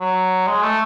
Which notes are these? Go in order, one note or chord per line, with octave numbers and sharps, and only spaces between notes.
F#3
G#3
A3